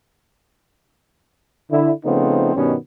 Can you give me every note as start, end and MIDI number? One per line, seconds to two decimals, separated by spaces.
1.71 1.92 50
1.71 1.92 64
2.04 2.52 49
2.04 2.52 53
2.04 2.52 57
2.04 2.52 59
2.04 2.52 60
2.04 2.52 63
2.55 2.75 43
2.55 2.75 47
2.55 2.75 51
2.55 2.75 55
2.55 2.75 59
2.55 2.75 61